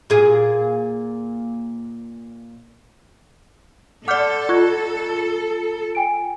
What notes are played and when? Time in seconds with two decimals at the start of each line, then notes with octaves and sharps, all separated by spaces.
0.10 A#2 G#4
4.08 A4 D5 F#5 D6 F6 G6
4.49 F4 C#6 F#6 G#6
5.95 G5 G#5 D7